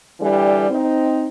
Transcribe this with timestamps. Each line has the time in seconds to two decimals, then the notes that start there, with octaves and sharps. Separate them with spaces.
0.21 D3 E3 G3
0.70 C4 D#4